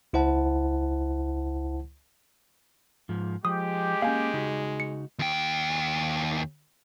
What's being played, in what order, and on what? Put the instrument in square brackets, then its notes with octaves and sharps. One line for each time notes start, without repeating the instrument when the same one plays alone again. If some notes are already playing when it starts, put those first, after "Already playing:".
[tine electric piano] C#2 E4 C5 F#5 A5
[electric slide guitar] G#2 F3
[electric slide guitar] F3 [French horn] G#3 [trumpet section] G4 [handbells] D#6
[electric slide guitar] A#3 C#4 [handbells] F5 G#5
[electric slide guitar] C#3 D#4 F#4
[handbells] C#7
[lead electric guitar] D#2 G5